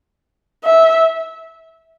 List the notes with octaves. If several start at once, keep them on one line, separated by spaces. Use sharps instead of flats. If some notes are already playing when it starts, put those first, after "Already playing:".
E5